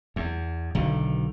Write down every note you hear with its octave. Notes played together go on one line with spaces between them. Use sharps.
E2
B1 D3 D#3